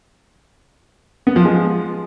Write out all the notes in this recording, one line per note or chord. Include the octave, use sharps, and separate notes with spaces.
B3
F3
G#3